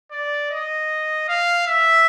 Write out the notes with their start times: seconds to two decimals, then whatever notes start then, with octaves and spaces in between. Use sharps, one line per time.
0.12 D5
0.51 D#5
1.28 F5
1.67 E5